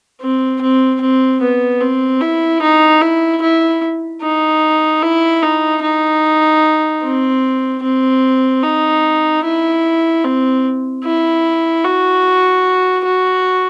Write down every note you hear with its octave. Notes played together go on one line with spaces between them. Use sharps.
C4
C4
C4
B3
C4
E4
D#4
E4
E4
D#4
E4
D#4
D#4
C4
C4
D#4
E4
C4
E4
F#4
F#4